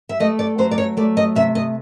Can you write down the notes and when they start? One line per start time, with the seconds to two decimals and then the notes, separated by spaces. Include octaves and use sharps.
0.09 E5
0.20 A3 D#5
0.39 D5
0.58 F#3 C5
0.71 D5
0.78 C#5
0.97 A3 D5
1.17 D#5
1.35 C3 E5
1.55 D#5